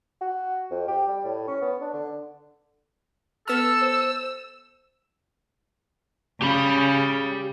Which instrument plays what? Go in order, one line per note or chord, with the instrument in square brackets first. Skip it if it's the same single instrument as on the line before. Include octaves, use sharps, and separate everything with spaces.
[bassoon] F#4
F2
G4
G3
A2
C#4
B3
D4
D3
[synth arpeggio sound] B3 F6 [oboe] A4 [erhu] E6
[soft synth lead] C5
[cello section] C#3 [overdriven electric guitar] G4 B5